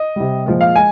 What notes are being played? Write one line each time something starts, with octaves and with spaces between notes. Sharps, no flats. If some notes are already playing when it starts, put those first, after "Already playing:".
Already playing: D#5
C3 G3
A#2 F3 G#3
F5
G#3 G#5